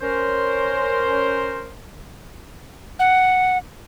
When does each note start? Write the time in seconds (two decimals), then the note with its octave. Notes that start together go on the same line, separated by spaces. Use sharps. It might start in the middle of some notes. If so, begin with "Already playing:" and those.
0.01 C#4 A#4 C5
2.99 F#5